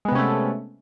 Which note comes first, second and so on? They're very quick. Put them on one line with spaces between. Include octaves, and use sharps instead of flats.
G#3 B3 C3 C#4 A3